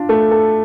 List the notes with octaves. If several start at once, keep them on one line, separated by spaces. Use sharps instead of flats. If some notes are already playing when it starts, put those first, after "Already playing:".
Already playing: D4 F4
A3
A4